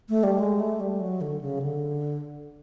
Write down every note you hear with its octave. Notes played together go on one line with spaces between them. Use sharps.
A3
G3
G#3
A3
G3
F#3
D3
C#3
D3